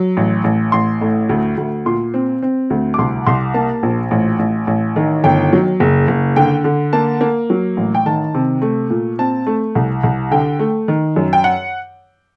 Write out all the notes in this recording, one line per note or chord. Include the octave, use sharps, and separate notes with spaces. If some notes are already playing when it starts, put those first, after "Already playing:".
Already playing: F#3
A1
A1
A1 C6
A2
D2
D2
A#2 C6
C4
C4
D2
D6
C2 C6
C2 C6
A#3 A5
A#1
A1
A1
A1
D#3
G1 G5
F#3
F#1
F#1
D3 G5
D3
A#3 A5
A#3
F#3
A1
G5
D#3 A5
C3
A3
A#2
C4 A5
A3
C2
C2
D3 G5
A3
D#3
F#2
G5
F#5